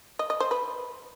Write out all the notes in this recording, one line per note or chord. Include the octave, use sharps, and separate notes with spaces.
D#5
D#5
C5
B4